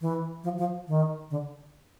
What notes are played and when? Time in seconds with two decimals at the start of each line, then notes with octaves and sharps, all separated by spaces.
0.01 E3
0.44 F3
0.58 F3
0.88 D#3
1.30 D3